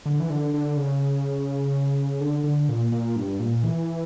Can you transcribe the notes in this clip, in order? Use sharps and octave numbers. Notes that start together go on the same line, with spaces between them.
D3
E3
D3
D3
C#3
D3
D3
A#2
A#2
G2
A#2
E3